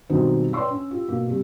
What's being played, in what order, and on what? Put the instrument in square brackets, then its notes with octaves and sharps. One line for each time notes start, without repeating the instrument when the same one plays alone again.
[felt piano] B2 D#3 F#3 G3 C4 D#4
B4 C#5 D5 G5 C6 E6
C#4
F4 G4
B2 A#3
C3 G3